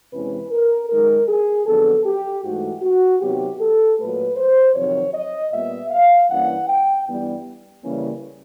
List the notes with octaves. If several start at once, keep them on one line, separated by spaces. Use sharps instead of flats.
E2 C3 E3 G#3 C#4 B4
A#4
F#2 D#3 G#3 A#4
G#4
F2 D3 F#3 B3 A4
G4
G#2 E3 A3 F#4
F#4
C3 D#3 F#3 B3 G4
A4
A#2 F#3 A3 B4
C5
F2 C3 D#3 F#3 C#5
D#5
A#2 G3 B3 E5
F5
G2 E3 G3 A#3 C#4 F#5
G5
G2 E3 G3 B3
C#3 E3 G3 A#3 C#4